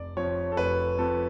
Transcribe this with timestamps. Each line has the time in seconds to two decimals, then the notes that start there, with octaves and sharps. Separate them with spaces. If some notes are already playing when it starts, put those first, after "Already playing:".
Already playing: F1 D5
0.17 F2 F3 C#5
0.52 A4
0.57 F1 B4
0.98 F2 F3 A4